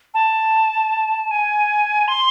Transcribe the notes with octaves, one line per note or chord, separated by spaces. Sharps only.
A5
G#5
C6